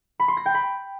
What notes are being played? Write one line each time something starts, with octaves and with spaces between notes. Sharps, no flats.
B5
C6
A#6
G5
B5